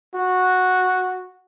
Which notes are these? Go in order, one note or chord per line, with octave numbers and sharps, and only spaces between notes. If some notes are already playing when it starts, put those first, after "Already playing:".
F#4